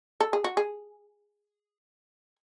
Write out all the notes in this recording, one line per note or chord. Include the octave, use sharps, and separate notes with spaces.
A4
G#4
F#4
G#4